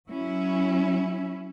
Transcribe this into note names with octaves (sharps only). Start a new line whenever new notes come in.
F#3 C#4 E4